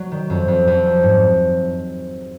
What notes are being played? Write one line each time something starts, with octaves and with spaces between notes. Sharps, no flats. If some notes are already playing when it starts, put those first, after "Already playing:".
Already playing: F#3
D#3
F2
F2
F2
F#3
G#2